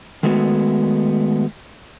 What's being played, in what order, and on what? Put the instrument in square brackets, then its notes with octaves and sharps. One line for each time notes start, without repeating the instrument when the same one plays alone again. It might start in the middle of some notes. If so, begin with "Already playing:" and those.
[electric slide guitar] D#3 G#3 A3 B3 F#4